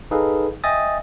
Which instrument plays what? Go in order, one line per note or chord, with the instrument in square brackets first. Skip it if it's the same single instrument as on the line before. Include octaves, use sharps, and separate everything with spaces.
[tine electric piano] D#4 G#4 A4 B4 F5
D#5 E5 G5 G#5 D#6 A6